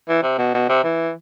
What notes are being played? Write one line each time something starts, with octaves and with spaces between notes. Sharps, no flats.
E3
C3
B2
B2
C3
E3